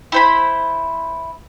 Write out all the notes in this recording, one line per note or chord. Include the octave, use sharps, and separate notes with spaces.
E4 C5 B5